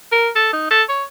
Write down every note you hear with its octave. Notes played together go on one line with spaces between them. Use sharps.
A#4
A4
D#4
A4
C#5